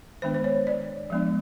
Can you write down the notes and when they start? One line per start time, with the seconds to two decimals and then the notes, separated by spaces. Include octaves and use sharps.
0.22 D#3 G#3 B3 D4 C5
0.34 C5
0.44 C#5
0.67 D5
1.10 F3 G#3 B3 D4